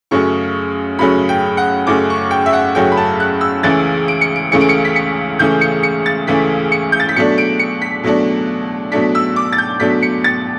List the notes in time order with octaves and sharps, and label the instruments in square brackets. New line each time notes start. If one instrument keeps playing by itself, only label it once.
[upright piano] F#2 C#3 F#3 A3 C#4 C#6
F#2 C#3 F#3 A3 C#4 B5
G5
F#5
F#2 C#3 F#3 A3 C#4 D6
C#6
G5
E5
F#5
F#2 C#3 F#3 A3 C#4 G5
B5
A5
F#6
E6
C#2 C#3 E3 A3 C#4 A6
D7
C#7
D7
C#2 C#3 E3 A3 C#4 C#7
D7
C#7
B6
C#7
C#2 C#3 E3 A3 C#4 G6
C#7
C#7
A6
C#2 C#3 E3 A3 C#4 B6
C#7
G6
A6
B6
B2 F#3 A3 D4 C#7
D7
C#7
B6
B2 F#3 A3 D4
B2 F#3 A3 D4 B6
E6
D6
A6
G6
B2 F#3 A3 D4 B6
C#7
A6